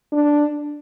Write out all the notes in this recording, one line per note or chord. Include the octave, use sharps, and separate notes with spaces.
D4